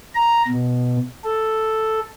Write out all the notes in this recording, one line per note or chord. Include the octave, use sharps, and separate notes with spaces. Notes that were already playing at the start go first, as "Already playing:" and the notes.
A#5
B2
A4